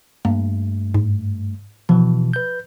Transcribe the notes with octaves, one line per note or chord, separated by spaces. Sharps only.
G2 A3 A#3
G#2
B2 E3 F3
B4 G6